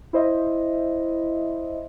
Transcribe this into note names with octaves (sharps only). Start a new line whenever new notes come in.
E4 C5 D#5 E5